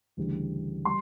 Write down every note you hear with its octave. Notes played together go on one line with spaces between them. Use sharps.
D2 C#3 E3 G3
G3 C6